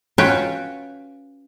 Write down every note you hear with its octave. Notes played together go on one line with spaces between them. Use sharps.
C#4 F4 F#4 B4 C#5 G5